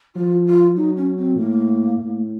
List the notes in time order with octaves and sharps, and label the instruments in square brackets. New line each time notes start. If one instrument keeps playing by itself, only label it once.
[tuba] F3 [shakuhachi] F4
[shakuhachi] F4
[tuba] F#3 [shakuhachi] D#4
[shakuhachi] C#4
C4
[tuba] A2 [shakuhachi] A#3
[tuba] A2